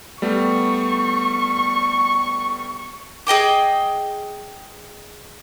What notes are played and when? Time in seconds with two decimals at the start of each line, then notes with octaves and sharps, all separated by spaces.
0.22 G3 A3 B3 C#6
3.27 G#4 D#5 G5 D6